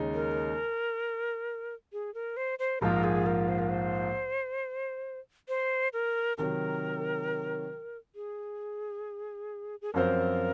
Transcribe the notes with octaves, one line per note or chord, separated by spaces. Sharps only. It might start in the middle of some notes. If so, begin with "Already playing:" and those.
Already playing: D#2 C#3 G#3 D#4
A#4
G#4
A#4
C5
C5
A#1 G#2 F3 A#3 F4 A#4
G#4
A#4
C5
A#4
C5
C5
A#4
C3 D#3 F#3 A#4
G#4
G#4
F#2 F3 C4 F4 A#4 C5